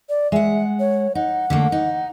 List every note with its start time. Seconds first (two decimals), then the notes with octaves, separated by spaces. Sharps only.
0.09 D5
0.32 G#3 E5 F#5
0.80 C#5
1.15 D#4 F#5
1.50 D3 A3 A#3
1.72 D#4